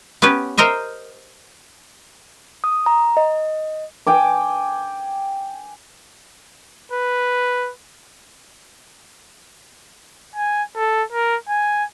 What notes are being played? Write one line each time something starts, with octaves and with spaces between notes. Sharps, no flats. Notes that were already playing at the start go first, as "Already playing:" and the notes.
B3 C#4 G4 B4
A#4 C5 D#5 E5
D#6
A#5
D#5
G5 G#5 D6
B4
G#5
A4
A#4
G#5